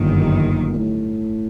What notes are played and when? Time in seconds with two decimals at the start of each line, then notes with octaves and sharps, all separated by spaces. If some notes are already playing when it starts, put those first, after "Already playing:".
Already playing: G1 F#2 A#2 D#3
0.34 A#2
0.73 A#2
0.78 A2